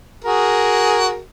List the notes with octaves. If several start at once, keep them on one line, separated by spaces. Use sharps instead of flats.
F#4 G#4 A#4